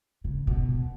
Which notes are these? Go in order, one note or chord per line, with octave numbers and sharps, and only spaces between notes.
C#3
B2